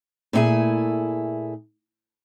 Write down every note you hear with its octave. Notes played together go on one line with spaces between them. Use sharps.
A#2 A3 D#4 E4 G#4 G#5